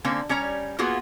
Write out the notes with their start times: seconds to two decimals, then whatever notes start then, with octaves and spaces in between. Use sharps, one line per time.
0.04 D3 A#3 C4 C#4
0.29 G3 C#4 C#5 A#5
0.79 A#3 B3 F4 F#4 G#4